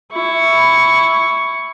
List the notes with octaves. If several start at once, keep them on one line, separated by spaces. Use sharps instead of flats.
E4 C#6